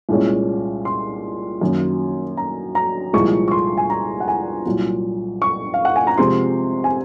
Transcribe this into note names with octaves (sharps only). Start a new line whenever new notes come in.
C2 A#2 G#3 C#4
C6
F#2 D#3 A#3 C#4
A#5
A#5
C2 A#2 F3 G#3 C#6
C#6
C6
G#5
A#5
F#5
G#5
C2 A#2 F#3
C#6
F5
F#5
G#5
A#5
C3 F3 G#3 C4 C6
G#5